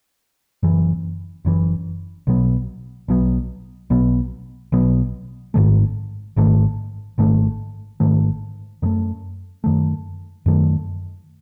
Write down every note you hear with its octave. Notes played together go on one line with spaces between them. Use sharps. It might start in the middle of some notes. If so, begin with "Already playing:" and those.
F#1 F#2 E3
F#1 F#2 E3
B1 B2 F#3 B3
B1 B2 F#3 B3
B1 B2 F#3 B3
B1 B2 F#3 B3
G#1 G#2 D#3 A3
G#1 G#2 D#3 A3
G#1 G#2 D#3 A3
G#1 G#2 D#3 A3
F#2 D#3 A3
F#2 D#3 A3
F#2 D#3 A3